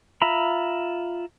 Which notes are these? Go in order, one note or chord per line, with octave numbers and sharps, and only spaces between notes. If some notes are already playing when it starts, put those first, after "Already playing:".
F4 E5 A#5 B5